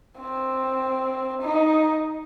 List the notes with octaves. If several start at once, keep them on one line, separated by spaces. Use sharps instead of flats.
C4
D#4